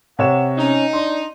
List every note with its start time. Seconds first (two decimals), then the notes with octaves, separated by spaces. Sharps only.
0.19 C3 C#5 F#5 E7
0.57 C#4 D#4
0.93 D4 C6